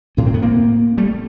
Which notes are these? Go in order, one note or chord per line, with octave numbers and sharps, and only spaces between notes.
A2 C#4
C4
B3
A#3 C4
G3 A3